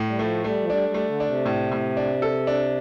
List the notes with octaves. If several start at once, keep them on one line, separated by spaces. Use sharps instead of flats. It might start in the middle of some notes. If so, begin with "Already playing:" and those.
Already playing: A2
G3
F3 A3
G3 A3
F3
G3 D4
G3
A3
D3
D4
C3
A2
A2
D4
A4
D4